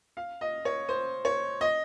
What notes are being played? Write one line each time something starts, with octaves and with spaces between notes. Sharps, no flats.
F5
D#5
C#5
C5
C#5
D#5